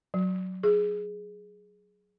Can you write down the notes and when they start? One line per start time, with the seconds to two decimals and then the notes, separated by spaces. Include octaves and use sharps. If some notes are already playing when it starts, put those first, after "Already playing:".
0.14 F#3
0.63 G#4